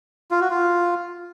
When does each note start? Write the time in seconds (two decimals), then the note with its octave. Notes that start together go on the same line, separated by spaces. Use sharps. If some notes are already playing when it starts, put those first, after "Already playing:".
0.31 F4
0.41 F#4
0.50 F4